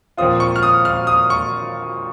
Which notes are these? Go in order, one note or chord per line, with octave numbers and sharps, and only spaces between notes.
A#2 F3 C4 F4 D#6
C#6
F6
D#6
F6
D#6
C#6